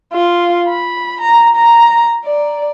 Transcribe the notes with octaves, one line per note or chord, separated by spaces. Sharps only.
F4
B5
A#5
A#5
D5